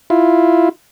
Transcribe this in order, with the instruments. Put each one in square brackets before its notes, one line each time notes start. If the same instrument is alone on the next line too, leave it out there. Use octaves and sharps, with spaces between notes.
[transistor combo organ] E4 F4